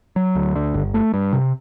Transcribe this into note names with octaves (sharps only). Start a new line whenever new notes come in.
F#3
D2
D3
G1
A3
G2
C3